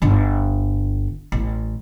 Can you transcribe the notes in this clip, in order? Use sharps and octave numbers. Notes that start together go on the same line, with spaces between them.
G1 D3
A1